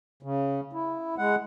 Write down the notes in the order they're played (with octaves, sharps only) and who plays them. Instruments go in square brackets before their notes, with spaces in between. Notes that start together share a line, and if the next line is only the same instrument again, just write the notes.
[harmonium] C#3
E4
G#3 F#5